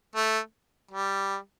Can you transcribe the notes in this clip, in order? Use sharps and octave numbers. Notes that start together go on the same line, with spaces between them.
A3
G3